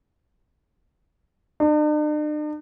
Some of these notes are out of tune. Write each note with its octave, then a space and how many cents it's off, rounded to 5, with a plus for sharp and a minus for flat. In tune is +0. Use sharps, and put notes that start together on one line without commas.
D4 +45